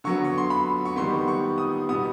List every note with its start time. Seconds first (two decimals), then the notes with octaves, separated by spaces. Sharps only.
0.04 D3 F#3 B3 C#6
0.24 C#6
0.38 C6
0.50 B5
0.85 C#6
0.96 D#3 G3 B3 C6
1.28 C#6
1.58 D#6
1.89 B2 G3 B3 D#6